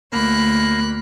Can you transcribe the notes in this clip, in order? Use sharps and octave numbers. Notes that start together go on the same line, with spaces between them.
D2 A#3 B5 F#6